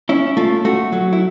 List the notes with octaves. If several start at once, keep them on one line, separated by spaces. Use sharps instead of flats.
C#4 E4
A3 F4
A3 F#4
F#3
E4